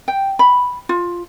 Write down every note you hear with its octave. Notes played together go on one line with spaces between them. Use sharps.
G5
B5
F4